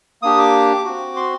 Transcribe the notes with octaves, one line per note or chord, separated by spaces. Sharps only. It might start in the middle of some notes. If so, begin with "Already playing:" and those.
A#3 D4 G4 D#6
D6
C4 F#4
C6